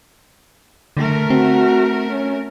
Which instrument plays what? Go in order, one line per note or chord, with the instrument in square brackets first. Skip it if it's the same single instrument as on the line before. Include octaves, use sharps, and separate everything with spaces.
[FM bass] D3 [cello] A3 A#4
[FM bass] C4 [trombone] F#4
[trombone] C#4